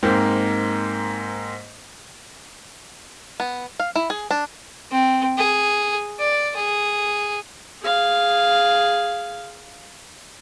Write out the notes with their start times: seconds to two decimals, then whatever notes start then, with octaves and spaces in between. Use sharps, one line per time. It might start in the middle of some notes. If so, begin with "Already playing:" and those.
0.03 G#2 A#3 C4
3.40 B3
3.80 F5
3.96 E4
4.10 G#4
4.31 D4
4.91 C4
5.38 G#4
6.19 D5
6.56 G#4
7.82 G#4 F5